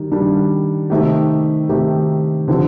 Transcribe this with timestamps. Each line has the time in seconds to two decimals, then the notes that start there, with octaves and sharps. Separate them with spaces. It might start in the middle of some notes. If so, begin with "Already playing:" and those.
Already playing: D#3 G3
0.12 D#3 G3 D4
0.90 C3 D#3 A3 D#4 G4
1.69 C3 D#3 A3 D#4 G4
2.48 D3 F3 C4 G4